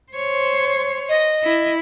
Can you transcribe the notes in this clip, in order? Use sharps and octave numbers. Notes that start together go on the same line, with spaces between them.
C5 C#5
D#5
E4